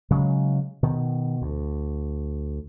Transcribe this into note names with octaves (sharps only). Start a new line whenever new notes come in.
C#3 F#3 G#3
B2 D#3
D2